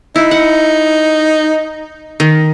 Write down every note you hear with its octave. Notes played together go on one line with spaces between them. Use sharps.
D#4 E4
F#5
D#3